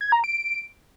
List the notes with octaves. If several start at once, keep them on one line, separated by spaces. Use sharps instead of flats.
G#6
A#5
D7